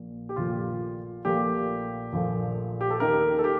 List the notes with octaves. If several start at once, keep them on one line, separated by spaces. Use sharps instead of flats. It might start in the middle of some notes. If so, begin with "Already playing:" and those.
Already playing: A#1 A#2 F3
G4
A#1 A#2 F3 A3 F4
A#1 A#2 F3 A3 G4
A#1 A#2 F3 A3
G4
A4
D#2 D#3 A3 A#4
A4
G4